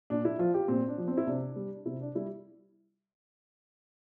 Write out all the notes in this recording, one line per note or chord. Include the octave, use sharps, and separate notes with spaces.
A#2 D4
E4
F3 F4
G4
A#2 C4
D4
F3
C4
E4
C3 D4
G3
C3 E4
D4
G3 E4